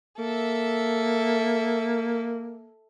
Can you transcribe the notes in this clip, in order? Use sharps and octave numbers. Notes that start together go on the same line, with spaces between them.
A#3 A4 E5